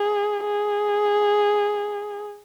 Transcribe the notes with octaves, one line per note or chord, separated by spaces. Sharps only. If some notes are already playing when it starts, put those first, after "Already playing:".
Already playing: G#4
G#4